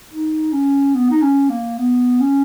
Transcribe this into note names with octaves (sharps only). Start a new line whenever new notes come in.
D#4
C#4
B3
D#4
C#4
A#3
B3
C#4